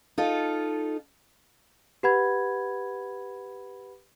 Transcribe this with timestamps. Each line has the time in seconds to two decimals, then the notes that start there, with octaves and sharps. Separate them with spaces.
0.18 D#4 F4 A4
2.03 G4 B4 F#5 B5 G#6